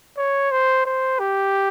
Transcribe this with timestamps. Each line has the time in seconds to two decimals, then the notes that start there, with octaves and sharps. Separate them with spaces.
0.18 C#5
0.52 C5
0.86 C5
1.19 G4